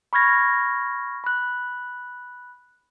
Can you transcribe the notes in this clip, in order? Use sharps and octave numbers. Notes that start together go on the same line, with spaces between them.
B5 C#6 F6 G#6 A#6
B5 F#6